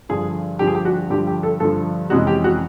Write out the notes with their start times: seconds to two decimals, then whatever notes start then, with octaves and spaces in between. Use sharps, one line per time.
0.09 G2 D3 F3 G#4
0.59 G2 D3 F3 G4
0.67 G#4
0.75 G4
0.85 F#4
1.10 G2 D3 F3 G4
1.27 G4
1.43 A4
1.60 G2 D3 F3 A4
2.10 F2 C3 E3 G#3 C#4 F#4
2.27 G4
2.44 F#4